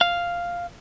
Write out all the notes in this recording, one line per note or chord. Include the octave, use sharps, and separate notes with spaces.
F5